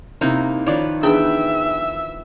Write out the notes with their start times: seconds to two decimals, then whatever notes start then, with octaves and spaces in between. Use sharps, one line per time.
0.21 C3 A#3 D#4 E4
0.66 D#3 F3 B4 C#5 D5
1.03 E3 B3 D4 G#4 E5 G5 B5